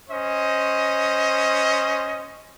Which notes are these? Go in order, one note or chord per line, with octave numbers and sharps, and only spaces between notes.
C#4 C5 D#5